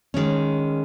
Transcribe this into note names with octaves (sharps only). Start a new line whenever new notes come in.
D#3 G#3 C#4